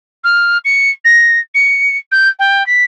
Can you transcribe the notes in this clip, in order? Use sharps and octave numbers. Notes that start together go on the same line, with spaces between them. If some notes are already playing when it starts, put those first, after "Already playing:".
F6
C#7
A#6
C#7
G6
G5
B6